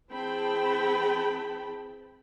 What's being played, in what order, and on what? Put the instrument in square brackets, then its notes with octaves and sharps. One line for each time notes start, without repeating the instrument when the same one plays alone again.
[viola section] E3 C4 G#4 G5 A5 B5